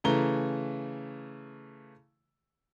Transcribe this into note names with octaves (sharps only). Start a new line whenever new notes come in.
C#3 E3 A3 A#5 G7